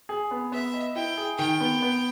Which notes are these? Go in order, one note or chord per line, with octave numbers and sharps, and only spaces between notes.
G#4
B3
B3 E5
D#5
E4 G5
G#4
D#3 G5
B3
B3